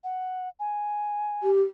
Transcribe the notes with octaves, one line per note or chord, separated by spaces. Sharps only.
F#5
G#5
G4